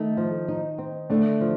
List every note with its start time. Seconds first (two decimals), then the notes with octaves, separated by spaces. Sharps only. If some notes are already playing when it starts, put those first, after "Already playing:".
Already playing: D#3 A3 D#4
0.17 F3
0.48 D#4
0.78 C4
1.10 D3 A3 D4
1.41 F3